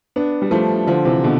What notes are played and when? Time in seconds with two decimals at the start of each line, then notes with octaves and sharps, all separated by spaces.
0.16 B3 D4
0.42 G3
0.51 F3 A3
0.87 D3 F3
1.05 C3 E3
1.24 B2 D3